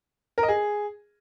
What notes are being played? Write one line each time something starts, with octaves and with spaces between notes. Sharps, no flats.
A#4
D#5
G#4